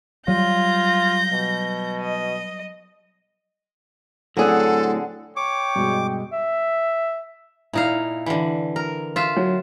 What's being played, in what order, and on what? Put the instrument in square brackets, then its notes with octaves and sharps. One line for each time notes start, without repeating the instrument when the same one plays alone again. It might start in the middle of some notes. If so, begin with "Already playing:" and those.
[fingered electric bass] F#3 G3 [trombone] F4 [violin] G6 A#6
[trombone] B2
[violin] D#5
[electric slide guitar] A2 F#3 C4 [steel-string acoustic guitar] D3 G#4 F#5 [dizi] A4
[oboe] C#5 [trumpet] G5 [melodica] D6
[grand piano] G2 B2 G#3
[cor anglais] E5
[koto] A#2 D#4 F5 [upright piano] E4
[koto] D3 E3
A#4
F4 E5
[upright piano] F#3